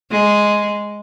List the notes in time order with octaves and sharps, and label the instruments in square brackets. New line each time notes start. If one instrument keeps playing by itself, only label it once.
[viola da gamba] G#3